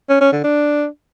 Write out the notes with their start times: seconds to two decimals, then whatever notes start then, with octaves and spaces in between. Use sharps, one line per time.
0.09 C#4
0.21 C#4
0.33 D3
0.44 D4